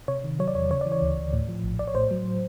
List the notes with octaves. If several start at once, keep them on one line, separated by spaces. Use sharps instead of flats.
C3 C#5
D#3
F#3 C#5
D5
E2 C#5
C#3 C#5
E3 D5
C#5
D2
D2
A2
F3
A#1
A#1 D5
C#5
A2 C5
F#3